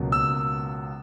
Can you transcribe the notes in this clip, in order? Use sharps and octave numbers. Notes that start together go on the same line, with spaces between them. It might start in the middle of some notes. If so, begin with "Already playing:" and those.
Already playing: C#2 B2 F#3 A#3
E6